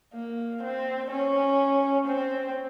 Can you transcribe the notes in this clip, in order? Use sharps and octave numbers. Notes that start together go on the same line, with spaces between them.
A#3
C4
C#4
C4